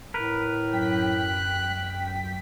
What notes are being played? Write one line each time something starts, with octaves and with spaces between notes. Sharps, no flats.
A2 A#4 B4
F#2 G5 F#6 B6